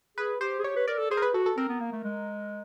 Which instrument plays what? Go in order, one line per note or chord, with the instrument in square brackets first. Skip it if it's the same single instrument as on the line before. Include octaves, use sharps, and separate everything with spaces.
[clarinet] G#4 [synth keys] B4
[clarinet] G4 [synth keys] C5
[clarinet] G#4
[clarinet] G4 [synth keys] C#5
[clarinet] B4
[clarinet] A#4 [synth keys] D5
[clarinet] A4
[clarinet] G#4 [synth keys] C5
[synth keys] A#4
B4
[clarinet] F#4 [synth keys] A4
[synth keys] A4
[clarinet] C4 [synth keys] A#4
[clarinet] B3
A#3
A3
G#3